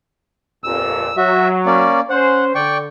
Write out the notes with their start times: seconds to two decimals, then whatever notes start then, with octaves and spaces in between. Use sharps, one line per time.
0.64 G1 F2 A#2 E6
1.17 F#3 F#4 E5
1.66 A#3 C#4 D5
2.10 C#4 C5 F#5
2.55 D3 D5 G5 C#6